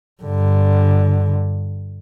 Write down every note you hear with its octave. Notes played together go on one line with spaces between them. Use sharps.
G2 D3